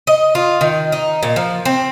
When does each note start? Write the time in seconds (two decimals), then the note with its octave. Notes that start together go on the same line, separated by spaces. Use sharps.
0.07 D#5
0.35 F4
0.61 D#3
0.92 D#4
1.23 A#2
1.36 F3
1.65 C4